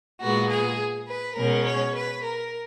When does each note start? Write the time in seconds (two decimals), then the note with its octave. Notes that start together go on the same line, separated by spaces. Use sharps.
0.21 A#2 G#3 B3 F#4
0.50 G#4
1.08 B4
1.36 B2 G#3 C#4 A#4
1.66 C#5
1.95 B4
2.24 A#4